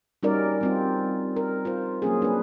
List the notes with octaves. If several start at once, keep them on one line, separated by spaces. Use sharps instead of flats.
G3 C#4 D#4 F#4 A#4 D5
G3 C4 F4
A#4
F4 C5
F#3 A#3 C#4 G#4
D4 B4